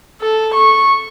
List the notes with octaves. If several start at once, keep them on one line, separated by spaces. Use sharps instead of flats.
A4
C#6